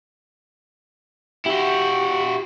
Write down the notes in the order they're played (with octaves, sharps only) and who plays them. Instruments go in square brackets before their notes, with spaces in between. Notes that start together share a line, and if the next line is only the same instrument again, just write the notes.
[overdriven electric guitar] E4 F#4 [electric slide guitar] G4